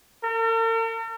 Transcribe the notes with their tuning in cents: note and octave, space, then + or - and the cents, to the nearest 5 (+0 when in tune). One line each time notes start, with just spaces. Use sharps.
A#4 -45